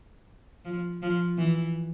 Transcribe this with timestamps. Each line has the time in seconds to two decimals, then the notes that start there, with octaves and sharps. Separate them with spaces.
0.65 F3
1.02 F3
1.37 E3